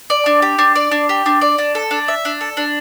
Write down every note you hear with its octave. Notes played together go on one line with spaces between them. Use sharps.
D5
D4
G4
D4
D5
D4
G4
D4
D5
D4
A4
D4
E5
D4
A4
D4